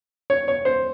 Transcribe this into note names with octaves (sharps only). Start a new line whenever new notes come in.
C#5
C#5
C5